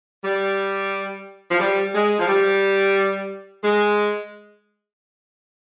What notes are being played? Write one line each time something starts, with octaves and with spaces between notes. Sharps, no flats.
G3
F3
G3
G#3
F3
G3
G#3